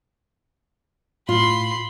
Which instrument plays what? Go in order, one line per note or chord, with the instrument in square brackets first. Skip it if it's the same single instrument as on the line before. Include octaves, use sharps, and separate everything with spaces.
[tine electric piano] A2 [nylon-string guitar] F4 [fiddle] B5 C6